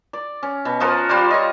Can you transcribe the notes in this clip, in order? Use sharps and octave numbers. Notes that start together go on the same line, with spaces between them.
D5
C#4
B2
F3 F4 F#4 A#4
G3 F4 C5 D5
C#5 D#5